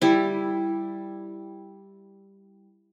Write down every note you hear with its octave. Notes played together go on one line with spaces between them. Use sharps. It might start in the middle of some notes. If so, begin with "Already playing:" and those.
G3 E4